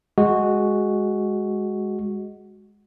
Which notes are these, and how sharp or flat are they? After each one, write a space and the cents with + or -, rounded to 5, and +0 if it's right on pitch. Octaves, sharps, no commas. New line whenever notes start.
G#3 +0 F#4 +0